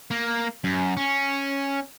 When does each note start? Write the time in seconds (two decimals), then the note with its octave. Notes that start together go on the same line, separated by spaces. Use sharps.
0.11 A#3
0.64 F#2
0.97 C#4